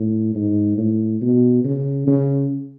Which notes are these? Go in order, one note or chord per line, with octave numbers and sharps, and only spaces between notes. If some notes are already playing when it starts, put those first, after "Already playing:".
Already playing: A2
G#2
A2
B2
C#3
C#3